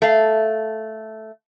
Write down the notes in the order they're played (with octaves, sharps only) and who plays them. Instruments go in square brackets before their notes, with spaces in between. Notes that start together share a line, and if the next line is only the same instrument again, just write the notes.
[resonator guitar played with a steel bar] A3 F5